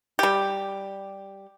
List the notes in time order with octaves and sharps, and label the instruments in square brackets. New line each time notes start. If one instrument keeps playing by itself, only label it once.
[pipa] G3 G4